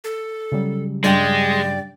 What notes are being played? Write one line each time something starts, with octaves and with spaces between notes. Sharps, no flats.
A4
C#3 F#3 G3
G2 G#3 D5 G5